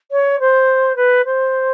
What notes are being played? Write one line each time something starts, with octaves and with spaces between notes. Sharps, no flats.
C#5
C5
B4
C5